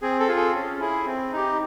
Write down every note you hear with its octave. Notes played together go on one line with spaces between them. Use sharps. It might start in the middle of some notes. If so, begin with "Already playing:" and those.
C4 G#4
A4
F4 G#4
A4
C#4
E4 G#4
C4
D#4 G4